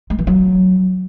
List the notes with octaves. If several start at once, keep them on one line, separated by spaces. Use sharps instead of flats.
G#3
E3
F#3